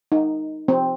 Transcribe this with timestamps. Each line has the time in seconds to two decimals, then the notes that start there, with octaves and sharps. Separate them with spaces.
0.12 D#4
0.68 C4